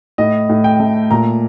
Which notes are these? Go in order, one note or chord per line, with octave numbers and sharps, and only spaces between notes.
A2 D#5
A2
G5
A3
A#2 A#5